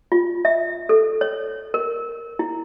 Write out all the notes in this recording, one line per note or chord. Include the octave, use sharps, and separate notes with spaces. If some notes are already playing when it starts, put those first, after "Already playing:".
F4
E5
A4
C#5
A#4
E4